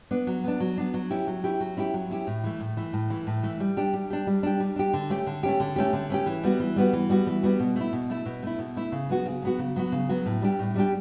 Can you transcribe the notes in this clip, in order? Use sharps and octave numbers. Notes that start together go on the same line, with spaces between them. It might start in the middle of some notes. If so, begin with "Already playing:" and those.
B3 D4
F#3
B3 D4
F#3
B3 D4
F#3
C#4 E4 G4
F#3
C#4 E4 G4
F#3
C#4 E4 G4
F#3
C#4 E4 G4
A2
E3 A3
A2
E3 A3
A2
E3 A3
A2
E3 A3
G3
D4 G4
G3
D4 G4
G3
D4 G4
G3
D4 G4
D3
A3 C#4 G4
D3
A3 C#4 G4
D3
A3 C#4 G4
D3
A3 C#4 G4
E3
G3 B3 F#4
E3
G3 B3 F#4
E3
G3 B3 F#4
E3
G3 B3 F#4
B2
A3 E4
B2
A3 E4
B2
A3 E4
B2
A3 E4
C#3
F#3 B3 F#4
C#3
F#3 B3 F#4
C#3
F#3 B3 F#4
C#3
F#3 B3 F#4
A2
G3 D4 G4
A2
G3 D4 G4